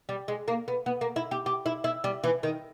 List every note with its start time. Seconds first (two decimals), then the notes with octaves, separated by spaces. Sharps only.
0.09 G3
0.28 G#3
0.48 A#3
0.68 B3
0.86 B3
1.01 A#3
1.16 E4
1.31 G4
1.46 G4
1.66 E4
1.84 E4
2.04 G3
2.24 E3
2.43 D#3